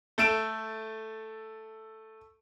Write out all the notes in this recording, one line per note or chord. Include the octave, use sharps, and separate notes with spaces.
A3 A4 D7 E7